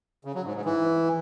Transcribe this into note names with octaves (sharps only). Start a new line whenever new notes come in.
C#3
F#3
G#2
G#2
E3